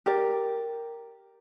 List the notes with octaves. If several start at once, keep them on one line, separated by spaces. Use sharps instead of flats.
G4 A#4 D5